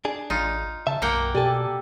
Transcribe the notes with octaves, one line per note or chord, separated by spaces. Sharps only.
D4 G#4
A1 D#4 F4
C#3 E5 A5
B1 F#2 A#3 A#4 F#5 G5
B2 G4 A4 D5 G#5 A5